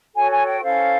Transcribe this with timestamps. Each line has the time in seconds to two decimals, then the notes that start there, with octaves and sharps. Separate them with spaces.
0.13 F#4 A4 C#5 G#5
0.29 G#5
0.44 G5
0.60 C#4 E4 A4 C5 F5